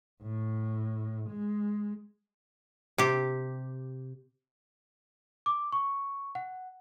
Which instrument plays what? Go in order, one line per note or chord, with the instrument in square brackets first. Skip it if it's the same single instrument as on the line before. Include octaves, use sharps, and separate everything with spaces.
[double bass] A2
G#3
[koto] C3 G4
[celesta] D6
C#6
F#5